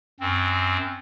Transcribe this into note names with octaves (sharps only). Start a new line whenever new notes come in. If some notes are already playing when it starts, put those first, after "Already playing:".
F#2 C4